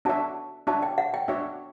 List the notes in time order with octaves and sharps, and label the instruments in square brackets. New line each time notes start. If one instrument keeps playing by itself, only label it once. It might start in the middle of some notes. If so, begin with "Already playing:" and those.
[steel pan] D4 F#4 C#5 E5 [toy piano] A5
[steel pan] D4 F#4 C#5 E5 [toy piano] A5
[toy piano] G5
F#5
G5
[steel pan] D4 F#4 C#5 E5